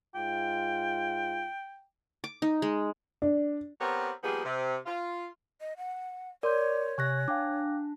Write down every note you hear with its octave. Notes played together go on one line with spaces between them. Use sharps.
G#2 F4 G5
D6
D#4
G#3
D4
B3 C4 G4 A#4 C#5
F3 G3 A#3 B3 G#4
C3
F4
D#5
F#5
A#4 C#5 D5 C6 G6
C3 G#5 C#6 F#6 A#6
D4 F5 G5 D6